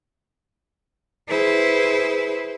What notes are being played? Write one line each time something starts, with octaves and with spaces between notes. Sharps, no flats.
E4 G#4 B4 C5